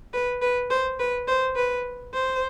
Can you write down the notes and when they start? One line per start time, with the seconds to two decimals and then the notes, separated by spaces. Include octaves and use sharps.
0.14 B4
0.42 B4
0.70 C5
1.00 B4
1.28 C5
1.56 B4
2.14 C5